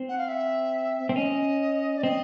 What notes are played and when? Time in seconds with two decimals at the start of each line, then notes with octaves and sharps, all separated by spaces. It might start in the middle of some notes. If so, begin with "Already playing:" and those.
Already playing: C4
0.09 F#5
0.18 F5
0.29 E5
1.09 C4
1.16 C#4 D#5
1.97 D5
2.03 C4 D#5